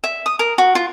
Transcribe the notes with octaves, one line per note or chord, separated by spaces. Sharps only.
E5
D#6
A#4
F#4
F4